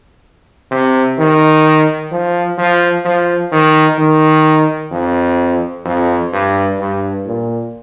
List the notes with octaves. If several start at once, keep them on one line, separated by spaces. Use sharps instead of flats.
C3
D#3
F3
F3
F3
D#3
D#3
F2
F2
G2
G2
A#2